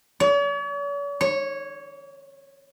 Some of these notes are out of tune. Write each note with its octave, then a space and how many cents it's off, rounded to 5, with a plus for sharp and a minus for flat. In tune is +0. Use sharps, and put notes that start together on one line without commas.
C#5 +45
C#5 -15